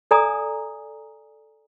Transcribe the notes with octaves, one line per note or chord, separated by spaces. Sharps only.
A4 D5 G#5 A#5 D#6